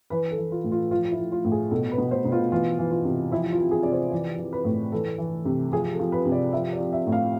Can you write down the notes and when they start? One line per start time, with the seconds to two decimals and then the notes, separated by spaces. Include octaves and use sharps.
0.10 E3 B4
0.31 A4
0.38 E3
0.52 F4
0.64 A2
0.72 F4
0.91 F3 F4
1.12 E4
1.18 F3
1.32 F4
1.45 A2
1.52 G#4
1.71 B2 A4
1.91 B4
1.98 B2
2.11 C5
2.25 B2
2.32 F4
2.52 E3 F4
2.79 E3
2.91 F4
3.04 C3
3.31 F3 E4
3.52 F4
3.59 F3
3.71 G#4
3.83 C3 D5
3.92 C5
4.11 E3 D5
4.38 E3
4.53 B4
4.65 A2
4.92 E3 A4
5.18 E3
5.45 C3
5.72 F3 G#4
5.93 A4
6.00 F3
6.12 B4
6.25 C3
6.32 D5
6.53 F3 E5
6.72 D5
6.79 F3
6.93 E5
7.07 A2
7.12 F5